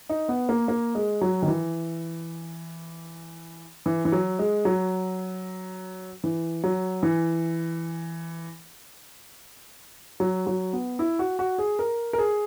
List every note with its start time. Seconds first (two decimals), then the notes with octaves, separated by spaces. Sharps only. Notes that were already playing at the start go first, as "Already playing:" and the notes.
0.09 D#4
0.29 B3
0.49 A#3
0.68 A#3
0.95 G#3
1.21 F#3
1.42 D#3
1.48 E3
3.86 E3
4.05 E3
4.12 F#3
4.39 G#3
4.65 F#3
6.24 E3
6.64 F#3
7.03 E3
10.20 F#3
10.47 F#3
10.73 B3
10.99 E4
11.19 F#4
11.39 F#4
11.58 G#4
11.79 A#4
12.13 A#4
12.18 G#4